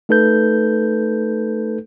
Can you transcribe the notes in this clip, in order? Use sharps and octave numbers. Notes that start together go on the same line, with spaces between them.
A3 D#4 A4 B4 G6